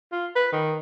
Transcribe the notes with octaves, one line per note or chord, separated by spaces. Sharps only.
F4
B4
D#3